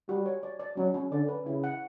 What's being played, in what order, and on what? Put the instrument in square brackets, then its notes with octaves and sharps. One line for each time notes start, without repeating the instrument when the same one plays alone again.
[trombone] G3 [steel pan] F#4
[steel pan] C#5
D5
D5
[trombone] F#3 [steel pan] C#4
[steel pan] C#4
[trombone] D3 [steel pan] D5
[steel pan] B4
[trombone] C#3 [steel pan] E4
[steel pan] F#5